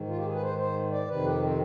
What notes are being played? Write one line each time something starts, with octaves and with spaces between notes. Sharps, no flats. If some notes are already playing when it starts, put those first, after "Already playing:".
Already playing: G#2 D#3
F4
G4
G#4
B4
C5
C5
D5
F2 C3 D#3 B4
G4
C4